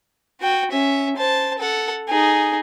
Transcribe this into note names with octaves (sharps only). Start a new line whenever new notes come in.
F#4 G5
C#4 E5
C5 A5
A4 F#5
D#4 G#4